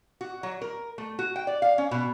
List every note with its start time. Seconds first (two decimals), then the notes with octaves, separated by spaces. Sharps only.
0.21 F#4
0.43 F#3
0.62 A#4
0.98 A3
1.19 F#4
1.36 G5
1.47 D5
1.62 F5
1.78 C#4
1.91 B2